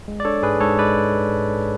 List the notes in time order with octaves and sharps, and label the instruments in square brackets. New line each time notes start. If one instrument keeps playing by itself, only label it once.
[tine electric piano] G#3
D5
D4 A4 C#5
G#2 G#4 B4
G#2 A4 C#5
G#3 B4 D5